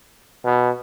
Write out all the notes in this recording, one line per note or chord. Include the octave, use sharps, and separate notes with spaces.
B2